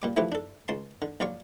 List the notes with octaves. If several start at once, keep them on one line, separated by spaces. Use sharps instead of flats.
A#2 G3 D6
E3 F3 A3 E4 G4 B4
D4 A4
C#2 A5 C6
D3
A#1 F#3 F4 D5 C#6